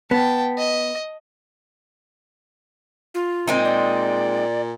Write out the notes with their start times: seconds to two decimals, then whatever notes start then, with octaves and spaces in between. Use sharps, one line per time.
0.11 B3 G5 A5
0.58 D#5
3.14 F4
3.47 A#2 G#3 C4 D#4
3.65 D5